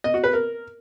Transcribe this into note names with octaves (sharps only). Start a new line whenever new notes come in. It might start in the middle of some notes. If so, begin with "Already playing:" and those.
D#5
F#4
B4
A#4